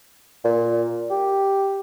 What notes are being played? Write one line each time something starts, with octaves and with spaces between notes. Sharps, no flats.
A#2
G4